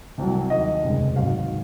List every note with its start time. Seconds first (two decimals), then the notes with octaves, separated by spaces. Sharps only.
0.18 C2 C3 F#3
0.50 D#2 D#3 F#3 D#5
0.83 F1 D#2 C#3 G#3
1.16 G#1 G#2 F#3 F5